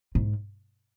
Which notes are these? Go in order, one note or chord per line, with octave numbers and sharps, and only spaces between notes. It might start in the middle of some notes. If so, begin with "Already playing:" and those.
G#2